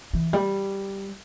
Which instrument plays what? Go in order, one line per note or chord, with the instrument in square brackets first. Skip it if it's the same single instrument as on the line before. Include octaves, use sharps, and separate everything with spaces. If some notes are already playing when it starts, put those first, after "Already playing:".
[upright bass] E3
G3